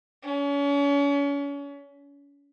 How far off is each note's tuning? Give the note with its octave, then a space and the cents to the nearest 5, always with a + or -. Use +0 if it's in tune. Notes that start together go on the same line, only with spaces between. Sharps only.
C#4 +35